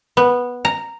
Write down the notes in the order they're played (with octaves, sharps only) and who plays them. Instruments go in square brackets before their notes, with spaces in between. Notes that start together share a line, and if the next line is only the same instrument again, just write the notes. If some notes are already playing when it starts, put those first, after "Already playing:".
[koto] B3
A#5